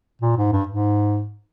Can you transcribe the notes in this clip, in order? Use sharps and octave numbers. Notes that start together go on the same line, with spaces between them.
A#2
G#2
G2
G#2